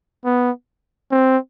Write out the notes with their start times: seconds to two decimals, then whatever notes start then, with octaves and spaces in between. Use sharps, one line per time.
0.25 B3
1.11 C4